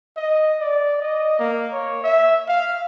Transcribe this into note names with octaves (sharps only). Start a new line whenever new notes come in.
D#5
D5
D#5
A#3
C#5
E5
F5